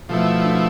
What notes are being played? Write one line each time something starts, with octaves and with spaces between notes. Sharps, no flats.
B2 F3 A3 E4
D3